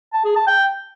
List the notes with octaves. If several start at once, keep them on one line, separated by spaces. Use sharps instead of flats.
A5
G#4
A5
G5